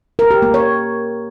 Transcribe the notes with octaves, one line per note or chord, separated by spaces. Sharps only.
A#4
G4
A#3
C#5